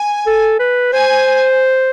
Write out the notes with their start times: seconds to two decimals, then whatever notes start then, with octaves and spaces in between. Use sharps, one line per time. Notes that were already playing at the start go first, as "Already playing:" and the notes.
Already playing: G#5
0.26 A4
0.59 B4
0.93 C5 G#5